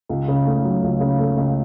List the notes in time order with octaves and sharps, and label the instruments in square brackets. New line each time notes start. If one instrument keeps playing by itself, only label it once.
[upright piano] C#2
C#3
A3
F#3
C#2
C#3
A3
C#2